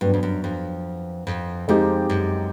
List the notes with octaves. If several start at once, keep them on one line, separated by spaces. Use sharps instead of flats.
G2 F#3 B3 D4
F2
F#2
F2
F2
F2 G#3 C4 D#4 G4
F#2